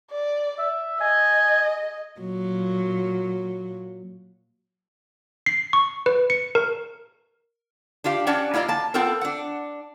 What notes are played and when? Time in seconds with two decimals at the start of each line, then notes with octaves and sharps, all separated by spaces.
0.11 D5
0.59 E5
1.01 D#5 G#5
2.21 A#2 F#3
5.46 C7
5.73 C#6
6.06 B4
6.30 C#7
6.55 A#4
8.04 D4 F4 G4 F5
8.27 C#4 D4 G4 D5 F#5 A5
8.54 A#3 E4 F4 D5 D#5
8.68 A#3 A5
8.94 B3 C4 F4 A4 A#4
9.21 D4 F#5